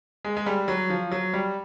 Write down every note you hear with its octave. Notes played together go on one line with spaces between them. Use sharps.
G#3
G#3
G3
F#3
F3
F#3
G3